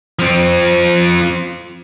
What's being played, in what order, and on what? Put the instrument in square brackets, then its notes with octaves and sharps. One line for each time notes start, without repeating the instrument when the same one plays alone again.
[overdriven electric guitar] F3 C4